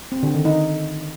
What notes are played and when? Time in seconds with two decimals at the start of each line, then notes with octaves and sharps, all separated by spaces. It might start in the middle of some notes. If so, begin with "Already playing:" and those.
0.12 C4
0.23 D3
0.34 D#3
0.45 D#4